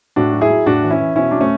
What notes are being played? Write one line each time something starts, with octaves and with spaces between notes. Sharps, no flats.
A2 D4 F#4
F#3
E4 G#4
F#3
A2 D4 F#4
E3
C#4 E4
E3
B2 C#4 E4
F#3 D4
A3 C#4